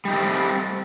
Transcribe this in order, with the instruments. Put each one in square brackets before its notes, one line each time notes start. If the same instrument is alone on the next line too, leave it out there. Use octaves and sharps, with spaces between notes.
[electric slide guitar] G3
D#4
A3
C#4
C4